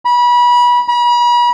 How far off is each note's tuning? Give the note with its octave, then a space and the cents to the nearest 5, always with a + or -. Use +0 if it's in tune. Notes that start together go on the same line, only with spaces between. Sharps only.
B5 -30
B5 -40